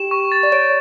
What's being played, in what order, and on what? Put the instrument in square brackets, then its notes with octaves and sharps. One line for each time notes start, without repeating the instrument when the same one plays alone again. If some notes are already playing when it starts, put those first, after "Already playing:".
Already playing: [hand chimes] G4 [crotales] E7
[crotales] C#6
A6
[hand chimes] D5
[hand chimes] C#5 [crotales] D7